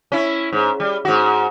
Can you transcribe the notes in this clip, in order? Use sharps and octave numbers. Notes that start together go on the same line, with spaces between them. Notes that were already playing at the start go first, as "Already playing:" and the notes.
C#4 E4
G#2
G3
G#2 F#4